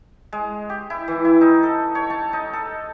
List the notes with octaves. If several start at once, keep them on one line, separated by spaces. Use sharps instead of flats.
G#3
G4
E4
E3
E4
D#4
A4
C#5
A5
D#4
A4